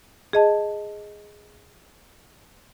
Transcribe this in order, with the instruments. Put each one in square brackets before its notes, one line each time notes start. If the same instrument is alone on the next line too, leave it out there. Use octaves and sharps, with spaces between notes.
[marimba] G#4 D#5 A5